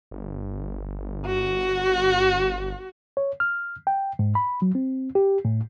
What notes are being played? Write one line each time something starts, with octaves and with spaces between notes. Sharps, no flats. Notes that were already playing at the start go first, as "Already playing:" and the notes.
G1
F#4
C#5
F6
G5
G#2
B5
F#3
C4
G4
A2